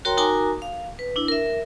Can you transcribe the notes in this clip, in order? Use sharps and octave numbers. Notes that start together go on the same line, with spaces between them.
F#4 A#4 C#5 G5 A#5 C6
D#4 F#4 A#4 G#5 A#5 D6
F5
B4
D4 E4
A#4 E5